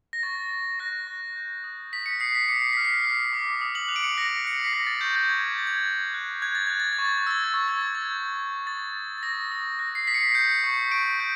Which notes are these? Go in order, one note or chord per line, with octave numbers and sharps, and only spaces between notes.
A#6
C#6 A6
C#6
F#6 A#6
C#6
G6
D#6
D#6 B6
C#7
D#6 C7
B6
D6 C#7
C7
F6 B6
C7
F6
D6
D#6
F#7
F#6 F7
D7
C#7
F#6 A#6
F#6 C#7
C7
B6
F6 A#6
A6
C#6 G6
G6
C#6 G#6
C#6 A6
G#6
F#6
F#6
F#6 G#6
A6
F#6 G#6
A6
G#6
C#6
A6
G#6
E6 A6
G#6
C#6 A6
G#6
E6 A6
G#6
G6
G6
D#6 A6
D#6
A6
D#6 A#6
D#6
F#6 A#6
C7
D#6 B6
C#7
C7
G6 C#7
C#6
C#6 D7
G6